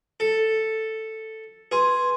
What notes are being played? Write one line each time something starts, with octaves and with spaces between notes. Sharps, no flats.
A4
G#4 B4 C6